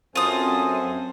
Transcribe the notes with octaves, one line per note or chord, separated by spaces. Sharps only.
F#2 C4 F4 A4 C5 G#5 D#6